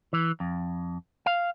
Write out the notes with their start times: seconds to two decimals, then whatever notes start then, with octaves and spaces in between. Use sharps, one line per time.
0.13 E3
0.40 F2
1.26 F5